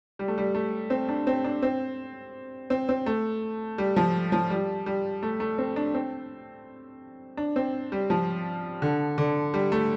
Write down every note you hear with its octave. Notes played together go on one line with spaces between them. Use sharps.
G3
A3
G3
A3
C4
D4
C4
D4
C4
C4
C4
A3
G3
F3
F3
G3
G3
A3
A3
C4
D4
C4
D4
C4
G3
F3
D3
D3
G3
A3